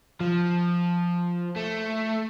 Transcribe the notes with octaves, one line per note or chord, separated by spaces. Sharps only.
F3
A3